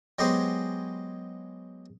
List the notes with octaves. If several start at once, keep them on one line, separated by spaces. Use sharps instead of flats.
F#3 G#3 B3 G4 G#4 C5